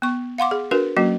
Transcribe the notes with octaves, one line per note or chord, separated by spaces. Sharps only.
B3 C#6
F5 F#5 C6 D6
G#4
D4 F#4 A#4 B4
F#3 A#3 C#4 F#4